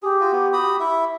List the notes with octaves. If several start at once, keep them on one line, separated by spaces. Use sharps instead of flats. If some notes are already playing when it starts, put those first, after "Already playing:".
G4 G#4
F4 F#4
B3
F#4 B5 D#6
E4 E5